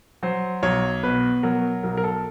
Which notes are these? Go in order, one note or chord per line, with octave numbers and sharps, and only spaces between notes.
F#3 C5
B1 C#5
B2 B4
F#3 A#4
B1 A#4
A#4
A4